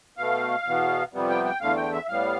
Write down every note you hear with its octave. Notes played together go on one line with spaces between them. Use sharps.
B2 A3 F5
E2 B2 B3
F2 C3 G3 B3
G5
G5
E2 D3 A3 F5
G5
E5
A2 G3 B3 F5